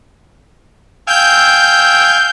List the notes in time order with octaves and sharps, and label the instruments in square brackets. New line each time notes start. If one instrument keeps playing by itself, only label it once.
[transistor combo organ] F5 G#5 [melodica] G5 E6 [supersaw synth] G6